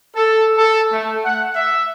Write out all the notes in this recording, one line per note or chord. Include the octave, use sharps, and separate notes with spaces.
A4
A4
A3
F#5
E5